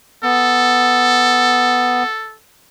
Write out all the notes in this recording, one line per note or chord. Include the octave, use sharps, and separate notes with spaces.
B3 A4